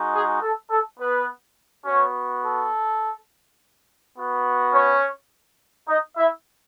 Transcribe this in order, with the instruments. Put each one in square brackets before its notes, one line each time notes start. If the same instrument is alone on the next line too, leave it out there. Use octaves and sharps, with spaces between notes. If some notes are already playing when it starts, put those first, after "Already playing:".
Already playing: [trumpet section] G#3 D#4 F#4
G#4
A4
A4
B3 B4
B3 C#4 F#4 C#5
A4
B3 F#4
C#4 C#5
D#4 D#5
E4 E5